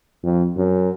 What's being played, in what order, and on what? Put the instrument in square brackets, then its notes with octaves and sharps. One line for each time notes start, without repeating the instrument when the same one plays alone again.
[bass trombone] F2
F#2